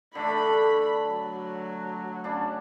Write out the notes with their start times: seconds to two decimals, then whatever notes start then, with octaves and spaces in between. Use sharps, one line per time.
0.15 D3 A3 D4 B5
1.10 F#3
2.24 C#3 D4